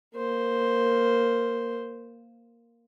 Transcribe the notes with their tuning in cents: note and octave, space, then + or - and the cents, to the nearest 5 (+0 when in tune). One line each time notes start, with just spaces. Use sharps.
A#3 +0 C5 +0